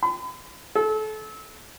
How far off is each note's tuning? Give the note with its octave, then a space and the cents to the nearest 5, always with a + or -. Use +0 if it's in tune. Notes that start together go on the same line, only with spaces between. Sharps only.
B5 +45
A4 -30